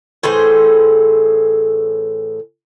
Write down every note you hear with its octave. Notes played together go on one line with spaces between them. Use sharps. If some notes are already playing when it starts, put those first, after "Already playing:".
A2 E3 G#4 C5